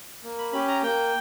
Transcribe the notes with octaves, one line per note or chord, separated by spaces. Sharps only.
A#3
B5
C#4 G4 B5
A#5
A#3 G5